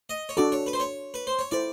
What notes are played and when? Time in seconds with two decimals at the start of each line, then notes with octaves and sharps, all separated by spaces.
0.10 D#5
0.29 C#5
0.37 D4 F#4 A4 D5
0.52 C#5
0.67 B4
0.73 C5
0.80 C#5
1.14 B4
1.27 C5
1.39 C#5
1.51 E4 A4 C5 D5